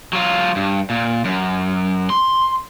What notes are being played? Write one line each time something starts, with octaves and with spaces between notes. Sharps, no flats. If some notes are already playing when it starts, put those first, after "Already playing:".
F#3 F4
G2
A#2
F#2
C6